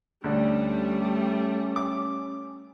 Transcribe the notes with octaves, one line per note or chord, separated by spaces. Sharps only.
D2 G3 A3 C#4 D4
D6